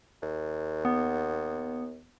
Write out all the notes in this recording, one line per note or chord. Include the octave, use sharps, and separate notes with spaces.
D#2
B3